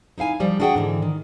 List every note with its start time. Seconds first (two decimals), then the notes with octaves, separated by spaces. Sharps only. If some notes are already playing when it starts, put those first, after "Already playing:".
0.18 D#4 E4 F5 G#5
0.40 F3 G3
0.60 D4 E4 F#4 G#4 F#5 G5
0.75 G#2 D3 E3
1.02 D#3